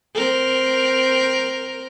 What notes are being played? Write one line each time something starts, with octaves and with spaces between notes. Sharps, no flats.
C4 A#4